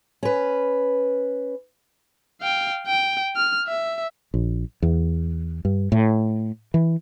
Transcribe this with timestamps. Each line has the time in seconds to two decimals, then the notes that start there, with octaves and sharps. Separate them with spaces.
0.23 C#4 B4
2.41 F5 G5
2.87 G5
3.36 F6
3.67 E5
4.34 A#1
4.82 E2
5.65 G2
5.92 A2
6.74 E3